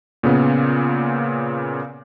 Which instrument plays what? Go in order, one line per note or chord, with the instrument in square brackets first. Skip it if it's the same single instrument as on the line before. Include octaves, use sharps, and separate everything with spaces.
[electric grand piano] A#2 C#3 B3